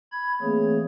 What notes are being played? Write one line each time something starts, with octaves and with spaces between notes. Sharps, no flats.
B5 G#6
E3 A3 A#3 C4 G#4 C#5